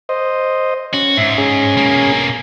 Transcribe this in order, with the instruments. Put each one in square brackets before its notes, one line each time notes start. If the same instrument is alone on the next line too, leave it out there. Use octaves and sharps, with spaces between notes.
[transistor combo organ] C5 D#5
[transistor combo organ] C#4 [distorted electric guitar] F#4
[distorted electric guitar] G#2 [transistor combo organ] E5
[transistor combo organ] C#4 G#4
[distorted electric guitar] B2 A#3